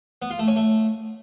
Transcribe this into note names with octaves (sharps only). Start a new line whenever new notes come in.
B3
F4
A3
C#4
A3